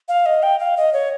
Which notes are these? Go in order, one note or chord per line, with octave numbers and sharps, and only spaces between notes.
F5
D#5
G5
F5
D#5
C#5